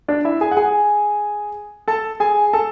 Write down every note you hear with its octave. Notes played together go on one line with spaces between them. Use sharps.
D4 D5
E4 E5
G#4 G#5
F#5
G#4 G#5
A4 A5
G#4 G#5
A4 A5